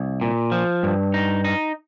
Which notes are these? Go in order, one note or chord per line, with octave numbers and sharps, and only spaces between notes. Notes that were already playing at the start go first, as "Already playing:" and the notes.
Already playing: C2
A#2
F3
G2
D#4
D#4